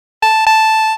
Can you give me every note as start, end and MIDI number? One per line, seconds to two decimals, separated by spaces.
0.22 0.45 81
0.47 0.93 81